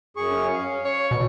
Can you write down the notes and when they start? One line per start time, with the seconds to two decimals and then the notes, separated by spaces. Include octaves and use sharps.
0.17 F#2 G#4 C#6
0.31 C#4
0.53 F5
0.85 C#5
1.11 B2